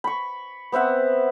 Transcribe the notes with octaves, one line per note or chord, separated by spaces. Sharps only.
B5 C#6
B3 C4 E5 F#5